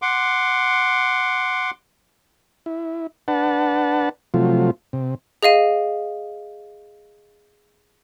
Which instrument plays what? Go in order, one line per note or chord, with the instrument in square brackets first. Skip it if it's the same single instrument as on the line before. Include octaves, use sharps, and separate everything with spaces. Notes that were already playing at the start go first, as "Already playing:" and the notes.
[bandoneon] F#5 C6 D6
[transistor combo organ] E4
D4 B4 F#5 A5
C3 F3 F#3 A3 F4
C3
[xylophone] G#4 D#5 F5 D#7